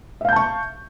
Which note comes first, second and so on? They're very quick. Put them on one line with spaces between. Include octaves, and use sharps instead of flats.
E5 F5 G6 A5 C#6